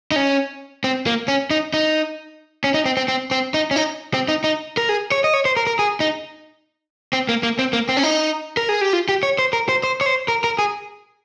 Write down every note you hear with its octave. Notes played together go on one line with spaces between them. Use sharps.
D#4
C#4
C4
A#3
C#4
D#4
D#4
C#4
D#4
C4
C4
C4
C4
D#4
C#4
D#4
C4
D#4
D#4
A#4
G#4
C#5
D#5
C#5
C5
A#4
A#4
G#4
D#4
C4
A#3
A#3
C4
A#3
C4
C#4
D#4
A#4
G#4
G4
F4
G4
C#5
C5
A#4
C5
C5
C#5
C5
A#4
A#4
G#4